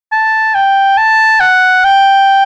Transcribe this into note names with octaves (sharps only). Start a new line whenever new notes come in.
A5
G5
A5
F#5
G5